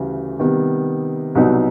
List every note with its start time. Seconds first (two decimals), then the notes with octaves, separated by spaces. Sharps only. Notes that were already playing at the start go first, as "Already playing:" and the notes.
Already playing: D2 C#3 E3 G3
0.39 C3 D#3 G3 B3
1.35 C2 B2 F#3 B3 D#4